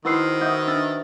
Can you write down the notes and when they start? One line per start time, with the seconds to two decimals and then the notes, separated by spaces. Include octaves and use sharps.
0.05 D#3 E4 F#4 B4 C5 E6 C7
0.41 F#4 D#5 E5 G6
0.67 D4 E6 A6